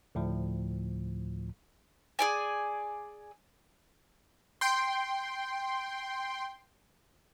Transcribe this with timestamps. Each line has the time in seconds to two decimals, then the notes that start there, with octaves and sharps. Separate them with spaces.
0.15 D2 A2 F3
2.19 G#4 D5 G#5
4.61 G5 C6